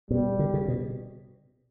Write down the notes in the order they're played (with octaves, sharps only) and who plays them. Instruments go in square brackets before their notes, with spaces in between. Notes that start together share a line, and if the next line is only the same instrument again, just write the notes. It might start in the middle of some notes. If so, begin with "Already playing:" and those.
[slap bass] B2 [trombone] G3
[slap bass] D3
C#3
B2